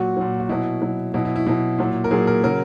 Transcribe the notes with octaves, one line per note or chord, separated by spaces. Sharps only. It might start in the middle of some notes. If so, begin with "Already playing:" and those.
Already playing: A#2 F#3 F#4
A#2 F#3
F#4
B2 F#3 E4
B2 F#3
B2 F#3 E4
E4
E4
B2 F#3
A#2 F#3
A#4
A#2 F#3 G#4
A#4
C#3 F#3 A#4